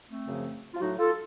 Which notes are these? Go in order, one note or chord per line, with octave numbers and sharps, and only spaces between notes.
A3 C4
F#2 C#3 F3
F4
A2 F#3 D#4 F#4
F4 A4